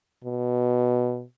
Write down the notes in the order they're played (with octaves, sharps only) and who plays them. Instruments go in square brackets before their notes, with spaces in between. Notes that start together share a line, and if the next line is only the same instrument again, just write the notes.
[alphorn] B2